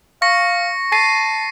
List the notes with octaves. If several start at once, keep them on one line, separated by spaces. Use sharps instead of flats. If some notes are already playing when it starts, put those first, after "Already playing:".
F5 C#6 A#6 C#7
A5 A6 C7 D#7